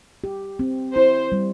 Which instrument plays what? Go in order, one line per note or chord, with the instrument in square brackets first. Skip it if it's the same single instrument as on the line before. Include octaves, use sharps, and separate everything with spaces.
[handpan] G4
C4
[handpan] E4 [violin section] C5
[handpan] G3